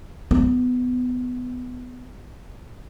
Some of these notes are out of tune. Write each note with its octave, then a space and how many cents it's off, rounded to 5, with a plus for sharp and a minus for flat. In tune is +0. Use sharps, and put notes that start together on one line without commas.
B3 +15